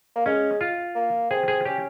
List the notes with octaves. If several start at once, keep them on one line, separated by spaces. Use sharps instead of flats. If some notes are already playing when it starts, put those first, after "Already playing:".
A#3
G#3 C#4
F4
A#3
C4 G#4
G#4
C#4 G4